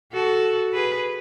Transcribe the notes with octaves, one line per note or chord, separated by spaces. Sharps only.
F#4 A4
G#4 B4